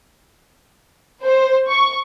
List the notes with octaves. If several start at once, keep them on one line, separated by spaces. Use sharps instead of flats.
C5
C#6